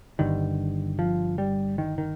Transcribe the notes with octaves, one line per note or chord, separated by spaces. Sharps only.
G1 G2 D3 D#3
F3
G3
D#3
D#3